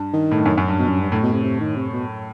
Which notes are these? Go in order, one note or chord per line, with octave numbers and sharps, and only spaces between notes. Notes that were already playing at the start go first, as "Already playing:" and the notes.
Already playing: G2
D#3
A2
G2
F#2
F#2
G2
B2
F#2
G2
A2
B2
C3
C3
D#3
C3
B2